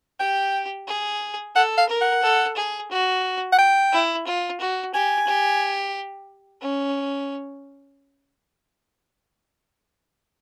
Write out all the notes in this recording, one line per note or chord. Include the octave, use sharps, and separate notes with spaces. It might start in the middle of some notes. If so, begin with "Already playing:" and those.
G4 G5
G#4
A4 F#5
F5
A#4
F#5
A4
G#4
F#4
F#5
G5
E4
F4
F#4
G4 G#5
G4
C#4